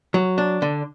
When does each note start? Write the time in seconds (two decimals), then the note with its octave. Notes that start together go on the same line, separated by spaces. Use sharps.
0.14 F#3
0.38 D4
0.62 D3